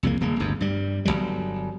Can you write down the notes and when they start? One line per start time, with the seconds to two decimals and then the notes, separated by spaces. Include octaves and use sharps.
0.03 C2 F2 C#3 A#3
0.21 D#1 C#3 A#3
0.40 G1 D2 G2
0.61 G2 G3
1.05 G1 F2 F#3 G3